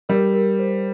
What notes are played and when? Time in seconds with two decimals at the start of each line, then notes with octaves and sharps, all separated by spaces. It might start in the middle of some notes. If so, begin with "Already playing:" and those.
0.09 G3 A#4
0.34 A#4
0.59 C5